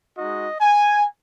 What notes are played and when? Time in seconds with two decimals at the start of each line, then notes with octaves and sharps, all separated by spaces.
0.17 G#3 D#4 F#4 D#5
0.60 G#5